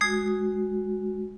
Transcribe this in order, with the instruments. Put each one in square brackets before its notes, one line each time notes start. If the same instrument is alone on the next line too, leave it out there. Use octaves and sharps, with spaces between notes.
[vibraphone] G#3 F#4 [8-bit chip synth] D#6 G#6 C7